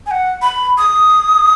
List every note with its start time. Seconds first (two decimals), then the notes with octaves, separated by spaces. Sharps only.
0.06 G#5
0.11 F#5
0.42 B5
0.78 D#6